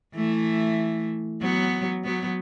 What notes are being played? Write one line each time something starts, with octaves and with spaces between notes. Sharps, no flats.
E3 A3
F#3 B3
F#3 B3